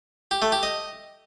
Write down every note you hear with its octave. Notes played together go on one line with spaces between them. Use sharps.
G4
A3
G4
D#5